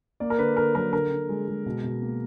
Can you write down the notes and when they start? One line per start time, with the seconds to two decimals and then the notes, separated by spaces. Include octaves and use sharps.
0.20 A#3 D5
0.30 A#4
0.38 D3 B4
0.57 D3 A#4
0.75 F#3 A#4
0.93 D3 A#4
1.11 D3
1.29 G#3
1.48 G#3
1.66 B2
1.84 B2
2.02 A#3